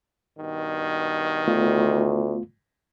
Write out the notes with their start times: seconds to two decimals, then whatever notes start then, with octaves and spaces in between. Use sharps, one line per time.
0.38 G2 B2 D#3
1.48 D2 A3 B3 F4